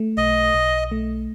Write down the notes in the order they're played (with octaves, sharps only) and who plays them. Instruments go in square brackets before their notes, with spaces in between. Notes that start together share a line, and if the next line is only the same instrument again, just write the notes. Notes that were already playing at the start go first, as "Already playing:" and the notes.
Already playing: [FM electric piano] A3
[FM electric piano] B1 [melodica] D#5
[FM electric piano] B1
A3